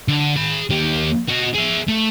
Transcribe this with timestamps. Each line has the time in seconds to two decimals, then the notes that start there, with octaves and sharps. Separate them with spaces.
0.08 D3
0.36 G#4 B5
0.70 D#2 G4
1.28 F#4 D#5
1.54 G#4 E5
1.88 A3